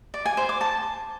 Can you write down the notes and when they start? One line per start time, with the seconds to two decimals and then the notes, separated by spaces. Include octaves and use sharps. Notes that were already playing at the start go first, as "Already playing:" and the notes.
0.14 D5
0.25 G#5
0.37 C5
0.49 D6
0.61 A5